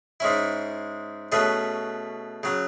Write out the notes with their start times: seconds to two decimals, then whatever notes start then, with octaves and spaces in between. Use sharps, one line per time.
0.20 G#2 G#3 C#4 E4
1.32 B2 A3 C#4 G#4 B4
2.43 C#3 F#3